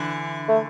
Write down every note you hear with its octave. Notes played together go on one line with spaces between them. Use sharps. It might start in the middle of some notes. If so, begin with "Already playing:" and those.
Already playing: D3 E3
A3